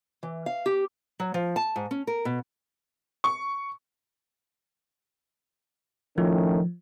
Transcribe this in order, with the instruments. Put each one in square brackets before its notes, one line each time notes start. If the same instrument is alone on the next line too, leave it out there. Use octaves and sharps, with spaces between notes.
[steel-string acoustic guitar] E3
F5
G4
[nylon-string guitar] F#3
F3
A5
G#2
C#4
A#4
B2
[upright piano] C#6
[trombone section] A2 D#3 C#4 [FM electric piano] F3